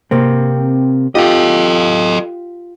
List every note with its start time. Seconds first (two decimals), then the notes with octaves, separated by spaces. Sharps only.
0.11 C3 A#3 C4
1.15 F4 G4 A4 D#5